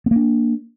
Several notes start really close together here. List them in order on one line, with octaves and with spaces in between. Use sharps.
B3 A#3 D4